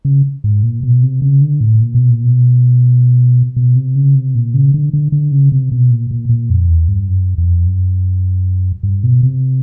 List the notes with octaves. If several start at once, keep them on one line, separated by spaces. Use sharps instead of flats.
C#3
G#2
A#2
B2
C3
C#3
D3
A2
A#2
B2
A#2
B2
B2
C3
C#3
C3
A#2
C#3
D3
D3
D3
C#3
C3
B2
A#2
A#2
A#2
F2
E2
G2
F#2
F2
F#2
G2
B2
C3